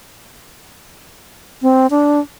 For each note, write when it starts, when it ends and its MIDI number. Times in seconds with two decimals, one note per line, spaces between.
1.62 1.87 60
1.90 2.19 62